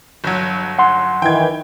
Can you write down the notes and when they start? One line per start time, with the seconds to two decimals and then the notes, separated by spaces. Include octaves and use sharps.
0.24 G1 F#3
0.79 F#5 C6
1.22 D#3 E3 G5 G#6